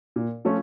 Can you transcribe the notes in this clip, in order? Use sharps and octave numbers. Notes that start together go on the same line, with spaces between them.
A#2
F3 A3 C#4 F4